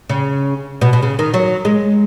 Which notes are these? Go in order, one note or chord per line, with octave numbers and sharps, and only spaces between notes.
C#3
B2
B2
C#3
D#3
F#3
G#3